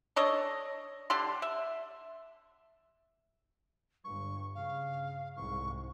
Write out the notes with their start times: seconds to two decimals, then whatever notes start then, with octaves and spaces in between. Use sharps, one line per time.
0.16 D4 A4 C#5 D#5
1.10 D3 G4 A4 C6
1.42 E5
4.04 G1 G2 C#6
4.55 C#3 F5
5.36 C2 G#2 C#6